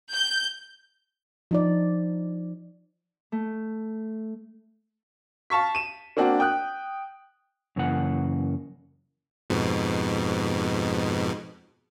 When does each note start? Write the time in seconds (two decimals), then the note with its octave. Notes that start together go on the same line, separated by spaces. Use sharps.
0.12 G6
1.51 F3 D#4 D5
3.32 A3
5.50 F5 A5 C#6 B6
5.75 D#7 E7
6.17 A#3 C4 D4 F#4
6.40 G5 D#6 F#6
7.76 F#2 C#3 E3 A#3 F#5
9.50 F2 G#2 B2